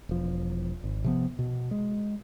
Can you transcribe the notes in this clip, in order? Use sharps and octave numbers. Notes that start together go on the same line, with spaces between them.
E1 F3
G#1
C3 F3 B3
B2
G#3